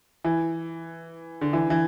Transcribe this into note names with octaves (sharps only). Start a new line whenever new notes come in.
E3
D3
E3
E3